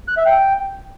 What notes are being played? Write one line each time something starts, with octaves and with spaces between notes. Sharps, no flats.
F#6
E5
G5